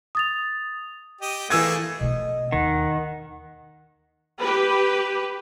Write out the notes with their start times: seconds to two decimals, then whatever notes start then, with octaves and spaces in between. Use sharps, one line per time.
0.15 D#6 A6 F7
1.21 G4 D#5
1.50 E3 A3 A#3 G#4 E6 G#6
2.00 B2 A3 D#5
2.52 D#2 D#3 F#5
4.40 G4 B4